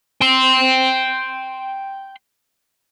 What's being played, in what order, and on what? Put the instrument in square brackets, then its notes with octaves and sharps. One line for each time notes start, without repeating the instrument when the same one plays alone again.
[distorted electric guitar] G5 C6